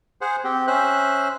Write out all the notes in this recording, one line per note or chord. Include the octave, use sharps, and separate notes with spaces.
G#4 C5 F#5
C4 G4
C#4 C5 E5 F#6